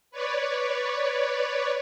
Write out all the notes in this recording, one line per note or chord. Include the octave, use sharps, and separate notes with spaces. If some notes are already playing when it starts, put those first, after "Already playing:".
B4 C#5 D5